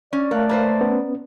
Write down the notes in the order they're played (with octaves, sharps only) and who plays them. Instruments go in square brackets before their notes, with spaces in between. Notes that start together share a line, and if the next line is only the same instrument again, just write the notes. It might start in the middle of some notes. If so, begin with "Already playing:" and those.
[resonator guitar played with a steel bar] C#4 [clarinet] D5
[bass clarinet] A3 [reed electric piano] A#4 F5 F#6 [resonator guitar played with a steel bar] C#5
[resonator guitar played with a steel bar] A#3 B4 C5
[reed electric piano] B3 C#4